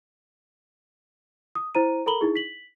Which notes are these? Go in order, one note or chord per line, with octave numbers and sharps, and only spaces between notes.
D#6
E4 C5 A#5 D#7
A4 A#4 A#5 B5 F#7 G7
D#4 E4 G#4
B6 F#7